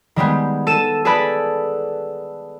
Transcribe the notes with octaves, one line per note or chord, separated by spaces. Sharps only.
D#3 G3 G#3 B3
A4 D#7 E7
G#4 A4 B4 D5 B5